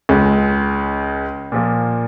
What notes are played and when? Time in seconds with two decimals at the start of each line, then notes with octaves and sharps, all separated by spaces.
0.09 C#2 C#3 G#3
1.52 A#2 F3 A#3